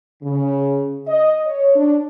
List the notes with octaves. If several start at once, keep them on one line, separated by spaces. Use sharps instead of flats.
C#3
D#5
C#5
D4